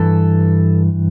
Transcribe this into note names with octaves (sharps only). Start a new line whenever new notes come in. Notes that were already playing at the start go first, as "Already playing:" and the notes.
Already playing: G2 E3 A4